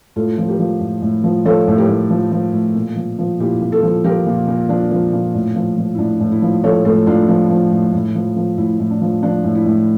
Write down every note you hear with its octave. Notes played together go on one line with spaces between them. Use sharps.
A2 F4 A4
F3
G4 A#4
F3
A2
A2
F3
F3 A4 C#5
A2
G4 A#4
A2
F3
F3
A2
A#2
F3
F3
A#2 E4 G4
A#2
F4 A4
F3
F3 G4 A#4
A#2
A#2
F3 D4
F3
A#2
A2
F3
F3
E4
A2 D4
A2
E4
F3
F3 A4 C#5
A2 F4 A4
A2 D4 F4
F3
F3
A2
A2
F3
F3
A2 E4
A2
D4
F3
F3 D4
A2
E4
A2